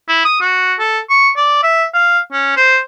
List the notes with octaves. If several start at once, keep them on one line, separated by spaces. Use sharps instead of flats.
E4
D#6
F#4
A4
C#6
D5
E5
F5
C#4
C5